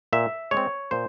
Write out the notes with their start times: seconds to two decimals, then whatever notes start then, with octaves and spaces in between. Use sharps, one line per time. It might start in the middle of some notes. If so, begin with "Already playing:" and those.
0.13 A#2 E5
0.51 G#3 C#5
0.57 C4
0.91 A#2 C5